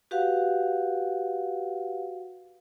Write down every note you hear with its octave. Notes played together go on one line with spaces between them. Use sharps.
F#4 G4 B4 F5 F#5